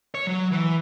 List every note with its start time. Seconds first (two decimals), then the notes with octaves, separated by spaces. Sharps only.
0.14 C#5
0.27 F#3
0.51 E3